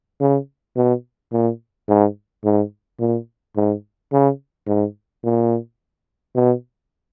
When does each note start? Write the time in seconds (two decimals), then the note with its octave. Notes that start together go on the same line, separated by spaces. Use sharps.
0.21 C#3
0.77 B2
1.33 A#2
1.89 G#2
2.45 G#2
3.00 A#2
3.56 G#2
4.12 C#3
4.68 G#2
5.24 A#2
6.36 B2